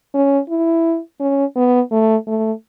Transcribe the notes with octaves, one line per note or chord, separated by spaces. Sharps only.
C#4
E4
C#4
B3
A3
A3